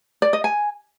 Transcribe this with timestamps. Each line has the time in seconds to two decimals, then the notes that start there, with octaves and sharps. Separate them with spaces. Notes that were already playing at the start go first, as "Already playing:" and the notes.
0.22 D5
0.33 D#5
0.44 G#5